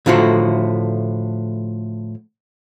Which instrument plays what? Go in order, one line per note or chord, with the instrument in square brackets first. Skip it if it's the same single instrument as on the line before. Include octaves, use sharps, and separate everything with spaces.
[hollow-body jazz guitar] A2 D3 F3 A3 F#4